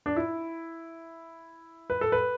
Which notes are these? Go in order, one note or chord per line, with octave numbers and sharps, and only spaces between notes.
D4
E4
B4
A4
B4